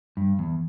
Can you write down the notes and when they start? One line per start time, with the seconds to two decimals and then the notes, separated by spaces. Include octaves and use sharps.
0.17 G2
0.39 E2